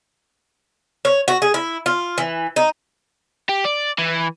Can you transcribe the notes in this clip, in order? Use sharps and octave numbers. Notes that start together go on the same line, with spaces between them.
C#5
F#4
G#4
E4
F4
E3
D#4
G4
D5
E3